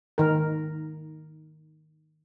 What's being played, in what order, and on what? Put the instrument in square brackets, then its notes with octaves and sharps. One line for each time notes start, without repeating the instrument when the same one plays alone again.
[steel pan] D#3 A#4